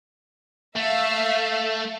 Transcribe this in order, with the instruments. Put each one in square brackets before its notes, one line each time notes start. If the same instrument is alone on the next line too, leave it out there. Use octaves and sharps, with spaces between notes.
[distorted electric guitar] A3 [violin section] E5 F5